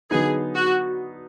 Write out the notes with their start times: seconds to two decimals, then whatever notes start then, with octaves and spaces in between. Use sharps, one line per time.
0.11 D3 F#3 B3 D#4 G#4
0.55 F#4